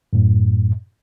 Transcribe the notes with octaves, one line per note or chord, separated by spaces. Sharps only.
F#2 A2